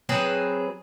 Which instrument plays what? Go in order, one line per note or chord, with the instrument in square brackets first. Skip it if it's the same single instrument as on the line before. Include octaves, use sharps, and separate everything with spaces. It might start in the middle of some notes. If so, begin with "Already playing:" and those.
[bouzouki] F#3 C4 G#4 B4